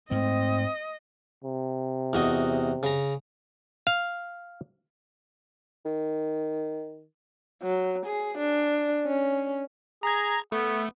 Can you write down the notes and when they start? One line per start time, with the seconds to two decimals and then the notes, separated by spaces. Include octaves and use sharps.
0.11 G#2 A3 C4 D#5
1.44 C3
2.13 E2 F#4 D#5
2.83 C#3 A#5
3.87 F5
5.86 D#3
7.62 F#3
8.06 G#4
8.38 D4
9.06 C#4
10.03 G#4 A#5 G#6
10.52 A3 B3